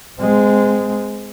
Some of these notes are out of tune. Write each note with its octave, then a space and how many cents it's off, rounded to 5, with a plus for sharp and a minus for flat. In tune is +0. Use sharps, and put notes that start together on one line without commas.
G#3 +0 C4 -30